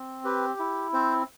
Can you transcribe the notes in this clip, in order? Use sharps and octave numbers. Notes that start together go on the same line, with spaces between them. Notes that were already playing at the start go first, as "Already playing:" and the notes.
Already playing: C4
G4 B4
E4
C4 C5